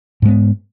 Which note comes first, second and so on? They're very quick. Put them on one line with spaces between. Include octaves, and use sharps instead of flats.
G#2 G#3 B3